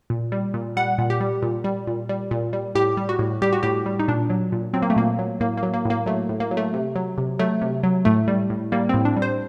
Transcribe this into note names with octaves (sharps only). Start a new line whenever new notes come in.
A#2
G3
A#2
G3 F#5
A#2
G4
G3
A#2
G3
A#2
G3
A#2
G3
A2 G4
G3
F#4
A2
G3 G4
F#4
A2 G4
G3
D#4
A#2 D4
F#3
A#2
F#3 C4
A#3
A3
A#2 A#3
F#3
A2 A#3
A#3
F#3
A#3
A2
A#3
F#3 A3
A2
A#3
F#3
A3
C3
F#3
C3
F#3 A3
C3
F#3
A2 A3
G3
A2
G3 A#3
A2 C4
D4
G3
C5